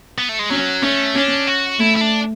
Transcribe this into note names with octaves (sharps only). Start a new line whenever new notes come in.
B3
A3
G#3
F#3 C#4
A3 C#4
C#4 D4
F#4
A3 E4
E4
D4